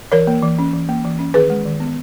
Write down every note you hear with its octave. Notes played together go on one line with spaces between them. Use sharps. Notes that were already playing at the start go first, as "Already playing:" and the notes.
E3 A#4 C#5
A#3
E3
C#4
E3
A#3
E3
C#4
D#3 G#4 B4
G#3
D#3
B3